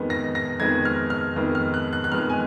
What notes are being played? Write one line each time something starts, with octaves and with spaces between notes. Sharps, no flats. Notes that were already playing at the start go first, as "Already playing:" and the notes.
Already playing: F2 D#3 G#3 B3
A#6
A#6
F2 D#3 G#3 B3 G#6
F6
F6
F2 D#3 G#3 B3
F6
F#6
F#6
F#6
F2 D#3 G#3 B3 F6
G#5